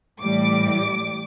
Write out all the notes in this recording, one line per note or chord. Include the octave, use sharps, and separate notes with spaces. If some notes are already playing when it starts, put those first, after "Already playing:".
A2 E3 G3 D6